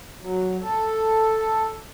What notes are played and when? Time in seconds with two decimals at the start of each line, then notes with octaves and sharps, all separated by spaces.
0.21 F#3
0.62 A4